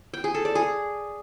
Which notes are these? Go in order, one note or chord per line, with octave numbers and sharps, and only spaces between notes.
G5
G#4
A4
D5
G#4